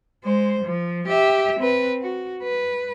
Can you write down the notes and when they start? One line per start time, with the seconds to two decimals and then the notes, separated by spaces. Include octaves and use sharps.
0.24 G#3 C5
0.64 F3
1.08 G4 E5
1.59 C4 B4
2.01 F#4
2.43 B4